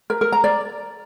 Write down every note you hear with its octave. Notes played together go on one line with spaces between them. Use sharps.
A#4
A#4
A#5
D5